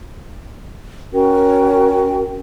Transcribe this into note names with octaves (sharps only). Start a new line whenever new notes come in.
C#4 F#4 A#4 G5